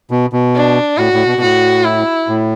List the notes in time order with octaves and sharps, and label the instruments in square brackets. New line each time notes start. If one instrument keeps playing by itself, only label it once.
[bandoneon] B2
B2
[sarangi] D4
[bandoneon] A2 [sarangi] F#4
[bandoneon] A2
B2
B2
[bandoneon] A2 [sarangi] F#4
[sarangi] E4
[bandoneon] A2